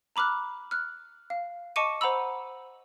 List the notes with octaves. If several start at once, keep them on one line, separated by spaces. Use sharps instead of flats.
A#5 B5 D6 F6 F#6
F6 F#6
F5
D#5 A5 C#6 D6 C#7 D#7
C5 F#5 A#5 B5 E6